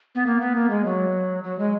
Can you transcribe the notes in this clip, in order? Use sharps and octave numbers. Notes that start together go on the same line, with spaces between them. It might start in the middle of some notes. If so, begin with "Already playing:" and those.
B3
A#3
B3
A#3
G#3
F#3
F#3
G#3